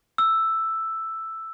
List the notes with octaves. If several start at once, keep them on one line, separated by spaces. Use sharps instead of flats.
E6